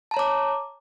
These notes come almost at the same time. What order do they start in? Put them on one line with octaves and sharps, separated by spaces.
A5 A#5 C#5 D6